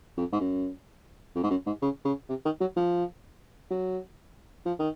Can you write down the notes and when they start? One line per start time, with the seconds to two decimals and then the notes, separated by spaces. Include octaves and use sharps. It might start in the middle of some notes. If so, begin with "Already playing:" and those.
0.17 F2
0.32 G#2
0.40 F#2
1.35 F2
1.43 G#2
1.50 F#2
1.66 G#2
1.82 C#3
2.05 C#3
2.29 C3
2.45 D#3
2.60 F#3
2.76 F3
3.70 F#3
4.65 F3
4.79 D#3